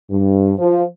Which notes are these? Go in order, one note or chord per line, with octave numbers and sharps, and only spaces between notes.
G2
F3